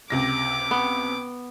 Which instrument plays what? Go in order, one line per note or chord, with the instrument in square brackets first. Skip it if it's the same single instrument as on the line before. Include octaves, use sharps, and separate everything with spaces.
[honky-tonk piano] C#2 C3 A#6 [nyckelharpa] D6
[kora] B3